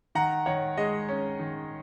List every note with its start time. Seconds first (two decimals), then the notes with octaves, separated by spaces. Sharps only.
0.15 D#3 F#5 A#5
0.46 D#3 C#5 F#5
0.77 G#3 D#5
1.08 C#4
1.39 D#3